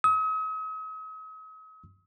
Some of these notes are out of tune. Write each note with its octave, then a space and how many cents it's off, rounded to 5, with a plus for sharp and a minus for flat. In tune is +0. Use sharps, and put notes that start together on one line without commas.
D#6 +45